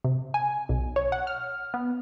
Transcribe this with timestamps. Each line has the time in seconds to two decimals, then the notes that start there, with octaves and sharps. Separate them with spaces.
0.04 C3
0.34 G#5
0.69 B1
0.96 C#5
1.12 F#5
1.27 F6
1.74 B3